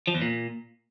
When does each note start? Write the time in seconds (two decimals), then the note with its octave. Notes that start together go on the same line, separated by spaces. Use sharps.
0.07 F3
0.15 E2
0.22 A#2